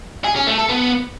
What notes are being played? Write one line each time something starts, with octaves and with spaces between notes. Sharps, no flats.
G#4
C#4
A3
A4
B3